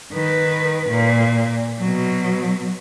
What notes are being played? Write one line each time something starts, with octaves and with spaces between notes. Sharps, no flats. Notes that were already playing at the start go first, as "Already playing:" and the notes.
D#3 B4
A#2
B2 F#3